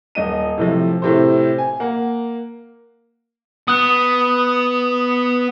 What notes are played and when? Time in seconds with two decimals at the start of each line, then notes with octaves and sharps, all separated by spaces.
0.15 D#1 D#5 D#7
0.58 A2 C3 F3
1.02 A2 C3 C5
1.58 G#5
1.80 A#3 F#5
3.68 B3 D#6 F#6